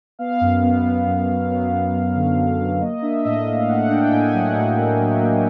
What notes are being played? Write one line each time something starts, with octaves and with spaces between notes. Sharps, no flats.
B3 F5
F#2
B3
B3
F#2
F#3
B3
F#2
F#3
D3
F#2
F#3
A#3 D#5
D4 E5
A2 D#5
A2 F5
A2 F#5
D4 G5
A2 G#5
F#3 F#5
A2
A#3
F#3
A#3